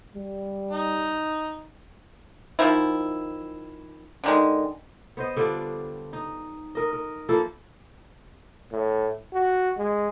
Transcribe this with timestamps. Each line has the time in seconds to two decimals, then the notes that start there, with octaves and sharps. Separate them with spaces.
0.15 G3
0.71 D#4
2.59 D#3 F3 E4
4.24 D3 D#3 G#3
5.17 B3 C5 D#5
5.37 D3 G3 D4 F4
6.13 D#4
6.75 A#4 D#5
6.93 A#4
7.29 F3 A#3 E4 A4
8.72 A2
9.33 F#4
9.78 G#3